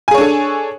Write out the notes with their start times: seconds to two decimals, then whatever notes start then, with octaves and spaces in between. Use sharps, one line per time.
0.08 G#5
0.11 G#4
0.14 C#5
0.18 D4
0.21 A4